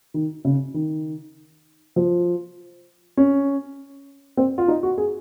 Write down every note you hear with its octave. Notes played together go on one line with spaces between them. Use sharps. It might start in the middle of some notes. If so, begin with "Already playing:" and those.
D#3
C#3
D#3
F3
C#4
C4
F4
D#4
F#4
G#4